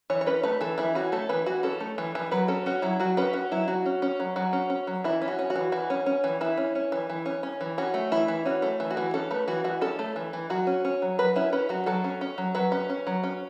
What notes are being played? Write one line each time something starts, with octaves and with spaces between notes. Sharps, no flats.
E3 C#5
C#5
C#4 B4
A3 B4
E3 A4
E3 E4
C#4 F#4
A3 A4
E3 B4
E3 F#4
C#4 A4
A3
E3
E3
F#3 B4
C#4 A4
C#4 F#4
F#3 E4
F#3 F#4
C#4 B4
C#4 F#4
F#3 E4
F#3 F#4
C#4
C#4
F#3
F#3 F#4
C#4
C#4
F#3
E3 E4
C#4
F#4
C#4
F#4
E3
E3 F#4
C#4
C#4
E3
E3 E4
C#4
C#4
E3
E3
C#4
C#4
E3
C#4 F#4
A3
E3 E4
E3
C#4 F#4
A3
E3
F#4
E3
C#4 A4
A3 B4
E3 F#4
E3 F#4
C#4 A4
A3
E3
E3
F#3 F#4
C#4
C#4
F#3
F#3 B4
C#4 E4
C#4 B4
F#3 F#4
F#3 A4
C#4
C#4
F#3
F#3 B4
C#4
C#4
F#3
C#4